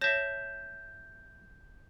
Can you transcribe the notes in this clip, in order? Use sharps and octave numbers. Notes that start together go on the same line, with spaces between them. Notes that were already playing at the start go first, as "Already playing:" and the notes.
C#5 E5 A5 G6 A#6